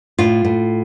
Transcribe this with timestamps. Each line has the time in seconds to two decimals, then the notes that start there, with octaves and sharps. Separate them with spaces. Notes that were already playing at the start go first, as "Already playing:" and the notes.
0.19 A2 F4
0.45 A2